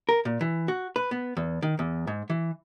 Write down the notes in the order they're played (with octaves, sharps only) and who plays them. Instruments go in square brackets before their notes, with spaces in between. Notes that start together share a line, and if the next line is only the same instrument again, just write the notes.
[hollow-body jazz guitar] A#4
A#2
E3
F#4
B4
B3
E2
D#3
E2
G#2
E3